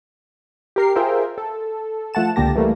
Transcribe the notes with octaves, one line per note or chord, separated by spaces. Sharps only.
G4 A#4 C7
F4 G#4 A#4 C5 E5 G5
A4
F3 A3 F#5 A5 E7
C#2 D3 A#3 G4 A5 A#6
E3 G3 A3 A#3